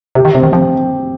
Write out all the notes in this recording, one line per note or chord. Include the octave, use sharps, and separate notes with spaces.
C3 G4
D#3
C3 C4
D#3
F3 C4